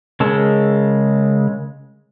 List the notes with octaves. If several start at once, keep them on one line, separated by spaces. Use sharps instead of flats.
C#3 G#3 A#4 A5 E6